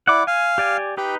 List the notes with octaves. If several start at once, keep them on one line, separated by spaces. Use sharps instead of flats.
E4 D5 F#5 D6
F5 G#5
G4 D5 G#5
D#4 G4 B4